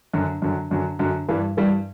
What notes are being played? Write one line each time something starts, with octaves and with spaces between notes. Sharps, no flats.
F#2 D3 F#3
F#2 D3 F#3
F#2 D3 F#3
F#2 D3 F#3
G2 E3 G3
G2 E3 G3